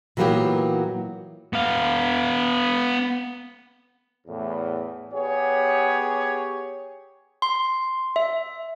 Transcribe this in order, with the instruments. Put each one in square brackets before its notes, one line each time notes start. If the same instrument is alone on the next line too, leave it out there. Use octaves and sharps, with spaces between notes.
[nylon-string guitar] A#2 E3 F#3 A#3 B3 G4
[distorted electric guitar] B3 F5
[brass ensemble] E2 A2
B3 G4 G#4 C#5
[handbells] C6
E5